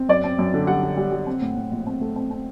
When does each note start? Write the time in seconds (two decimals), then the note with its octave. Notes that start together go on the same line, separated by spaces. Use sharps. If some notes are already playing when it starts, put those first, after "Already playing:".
Already playing: C4
0.09 F#2 D5
0.24 C4
0.39 F#2
0.54 D3
0.67 G3 F#5
0.83 D3
0.97 G3
1.12 G3
1.27 C4
1.41 A2
1.56 A2
1.71 A#1
1.87 C4
2.00 A3
2.16 C4
2.31 C4